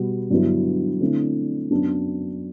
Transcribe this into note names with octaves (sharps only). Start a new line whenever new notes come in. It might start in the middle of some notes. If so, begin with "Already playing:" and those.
Already playing: B2 G3 B3 F#4
G2 D3 F#3 B3 E4
D3 A3 C4 E4
F#2 F#3 B3 D4